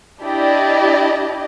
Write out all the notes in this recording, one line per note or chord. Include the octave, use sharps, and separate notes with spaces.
D4 E4 G4 D5 D#5